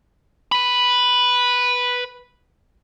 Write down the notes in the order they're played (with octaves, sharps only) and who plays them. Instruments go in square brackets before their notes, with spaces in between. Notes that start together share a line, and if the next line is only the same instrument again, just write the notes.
[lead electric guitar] B4 B5